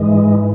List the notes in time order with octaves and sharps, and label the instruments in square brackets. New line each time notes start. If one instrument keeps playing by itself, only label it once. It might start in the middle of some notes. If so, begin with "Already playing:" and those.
Already playing: [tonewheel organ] G#2 E3 G#3